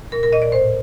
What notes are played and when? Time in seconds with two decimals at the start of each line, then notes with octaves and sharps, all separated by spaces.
0.12 A#2 A#4
0.23 A#4
0.33 A#2 D#5
0.42 D5
0.52 A2 C5